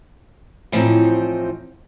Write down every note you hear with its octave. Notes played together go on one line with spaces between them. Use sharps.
A2 E3 F3 G3 C4 D#4